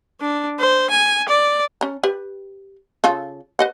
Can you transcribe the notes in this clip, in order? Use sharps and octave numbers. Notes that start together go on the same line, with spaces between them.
D4
C5
G#5
D5
C#4 A#5
G4 B4
C#3 F4 A4
B4 D#5 F#5